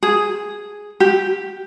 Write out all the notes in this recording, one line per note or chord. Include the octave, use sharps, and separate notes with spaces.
G#4
G4